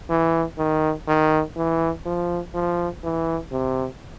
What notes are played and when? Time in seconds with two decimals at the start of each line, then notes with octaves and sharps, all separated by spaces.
0.10 E3
0.58 D#3
1.08 D#3
1.56 E3
2.06 F3
2.54 F3
3.04 E3
3.52 C3